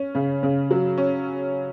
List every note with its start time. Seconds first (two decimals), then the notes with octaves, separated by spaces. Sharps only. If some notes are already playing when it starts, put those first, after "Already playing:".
Already playing: C#4
0.15 C#3
0.43 C#3
0.71 F#3
0.98 C#4